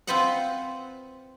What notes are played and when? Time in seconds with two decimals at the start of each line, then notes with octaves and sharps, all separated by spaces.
0.07 C4 F4 B4 C5 D#5 F#5